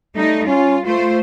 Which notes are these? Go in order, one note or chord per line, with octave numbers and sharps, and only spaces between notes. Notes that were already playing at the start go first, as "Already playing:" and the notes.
G3 A3 D#4
C#4 F4
A3 F4 C5